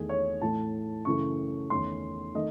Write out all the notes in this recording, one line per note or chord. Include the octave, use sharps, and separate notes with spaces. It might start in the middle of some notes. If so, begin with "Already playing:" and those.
Already playing: E2 D#3 A3 G#4
C#5
A2 E3 A3 A5
F#2 C#3 E3 A3 C#6
E2 D#3 A3 C#4 C6
D#3 A3 D#5